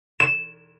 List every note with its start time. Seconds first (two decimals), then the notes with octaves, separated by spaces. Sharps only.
0.20 E7